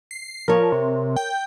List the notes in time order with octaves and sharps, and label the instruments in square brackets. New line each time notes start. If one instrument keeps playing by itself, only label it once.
[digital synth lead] C7
[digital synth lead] F3 [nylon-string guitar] A#4 C#5
[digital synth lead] C3
G5